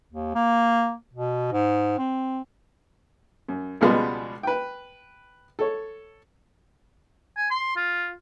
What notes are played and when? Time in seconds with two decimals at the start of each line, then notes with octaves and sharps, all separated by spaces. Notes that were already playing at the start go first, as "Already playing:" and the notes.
0.12 D#2
0.35 A#3
1.13 B2
1.52 G#2
1.98 C4
3.48 F#2
3.81 C#2 B2 F3 G3 G#3 B3
4.43 B4 G5
5.59 A4 C#5
7.37 G#5
7.51 C6
7.76 F4